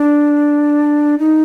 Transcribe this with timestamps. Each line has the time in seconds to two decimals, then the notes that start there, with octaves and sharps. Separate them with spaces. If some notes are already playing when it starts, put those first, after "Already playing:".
Already playing: D4
1.19 D#4